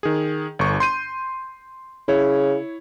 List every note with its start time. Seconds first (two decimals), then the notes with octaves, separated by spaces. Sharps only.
0.03 D#3 G#4
0.59 G1 C#6
0.80 C6 G6 D#7
2.08 C#3 E4 C#5